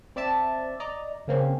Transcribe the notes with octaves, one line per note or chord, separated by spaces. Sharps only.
C4 D5 E5 A5
D5 D#5 A#5
C#3 A#3 C4 C#4